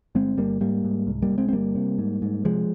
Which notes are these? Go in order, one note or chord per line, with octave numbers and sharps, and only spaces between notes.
G1 G#3 C4
G1 G3 A#3
G#2 G3 A#3
G#2
C2
G3 A#3
C2
G#3 C4
C4
G1 G3 A#3
C3
G#2
G#2
C3 F3 G#3